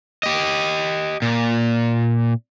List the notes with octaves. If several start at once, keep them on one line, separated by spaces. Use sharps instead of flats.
G4 D#5
A#2